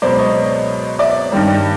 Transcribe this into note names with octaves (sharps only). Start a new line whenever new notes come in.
C#2 B2 F#3 C5 D5
C#5 D#5
D5 E5
G2 D#3 G3